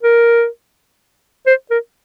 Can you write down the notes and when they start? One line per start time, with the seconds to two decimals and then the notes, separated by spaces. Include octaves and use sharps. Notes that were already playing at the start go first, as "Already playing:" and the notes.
0.03 A#4
1.46 C5
1.71 A#4